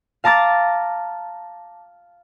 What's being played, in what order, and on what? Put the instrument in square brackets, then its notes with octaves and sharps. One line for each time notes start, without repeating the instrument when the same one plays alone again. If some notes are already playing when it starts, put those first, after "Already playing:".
[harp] F5 A5 A#5 D6 A6